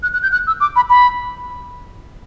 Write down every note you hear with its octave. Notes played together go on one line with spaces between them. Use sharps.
F#6
F#6
G6
F#6
E6
D6
B5
B5